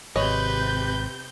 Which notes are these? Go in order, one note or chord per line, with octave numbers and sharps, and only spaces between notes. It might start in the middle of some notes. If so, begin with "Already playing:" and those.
G#1 C3 B4 C#5 D#5 G6